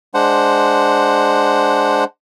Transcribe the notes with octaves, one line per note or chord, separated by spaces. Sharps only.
G#3 D4 C5 F#5